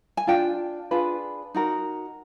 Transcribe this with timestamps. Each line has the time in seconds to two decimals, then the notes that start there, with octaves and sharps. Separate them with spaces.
0.17 G#5
0.27 D4 F4 G5
0.91 D4 F4 G#4 B4
1.54 D#4 F#4 A#4